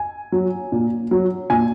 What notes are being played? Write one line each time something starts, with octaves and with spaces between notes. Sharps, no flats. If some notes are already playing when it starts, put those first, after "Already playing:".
Already playing: G#5
F#3
A#2
F#3
A#2 G#5